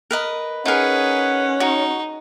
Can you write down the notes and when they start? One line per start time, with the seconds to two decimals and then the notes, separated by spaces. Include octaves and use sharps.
0.11 A#4 B4 D#5
0.66 C#4 D#4 G#4 A#4 B4 F#5
1.60 D#4 F#4